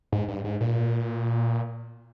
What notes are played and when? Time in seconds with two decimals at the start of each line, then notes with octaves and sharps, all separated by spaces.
0.12 G#2
0.28 G2
0.44 G#2
0.61 A#2